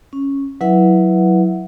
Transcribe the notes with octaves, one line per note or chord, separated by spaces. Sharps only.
C#4
F#3 E4 B4 E5 F#5